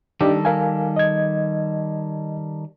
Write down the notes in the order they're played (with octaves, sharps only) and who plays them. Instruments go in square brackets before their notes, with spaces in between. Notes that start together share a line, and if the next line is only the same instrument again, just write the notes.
[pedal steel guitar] D#3 G3 A4 [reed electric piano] D4 D#4 G4
[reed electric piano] A#4 F5 G#5
D#5 G#6